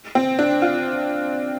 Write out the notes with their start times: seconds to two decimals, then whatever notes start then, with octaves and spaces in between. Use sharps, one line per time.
0.15 C4
0.39 D4
0.62 F4